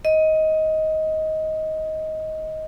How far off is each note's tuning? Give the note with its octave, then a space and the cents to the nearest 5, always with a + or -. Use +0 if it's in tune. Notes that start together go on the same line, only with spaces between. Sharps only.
D#5 +15